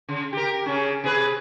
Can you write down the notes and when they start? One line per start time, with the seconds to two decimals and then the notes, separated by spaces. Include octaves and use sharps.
0.08 C#3
0.33 G4 A#4
0.66 C#3 C#4
1.04 C3 G#4 B4